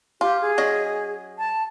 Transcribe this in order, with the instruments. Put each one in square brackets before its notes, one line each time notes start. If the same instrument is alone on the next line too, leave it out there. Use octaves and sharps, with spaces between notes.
[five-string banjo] F4 [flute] G4
[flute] G#4
[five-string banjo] F#3 C#4 D#5
[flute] A5